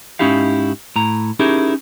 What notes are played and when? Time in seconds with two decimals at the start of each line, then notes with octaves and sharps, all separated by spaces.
0.19 G#2 C#4 D#4 E4 G4 F5
0.96 A2 A#5
1.39 C#4 D#4 E4 G4 G#4 A#4